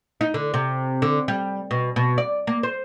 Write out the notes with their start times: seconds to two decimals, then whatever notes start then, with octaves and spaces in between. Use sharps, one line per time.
0.21 D#4
0.34 D3
0.54 C3
1.02 D3
1.28 G3
1.71 B2
1.96 B2
2.18 D5
2.47 A#3
2.63 C5